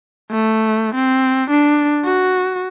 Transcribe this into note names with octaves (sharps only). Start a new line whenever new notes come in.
A3
C4
D4
F#4